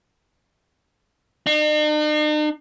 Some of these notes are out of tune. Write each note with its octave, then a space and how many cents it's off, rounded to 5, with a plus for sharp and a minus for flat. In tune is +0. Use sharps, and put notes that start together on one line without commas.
D#4 -45